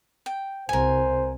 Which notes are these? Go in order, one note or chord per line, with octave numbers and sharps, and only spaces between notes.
G5
C2 A#4 C5 G#5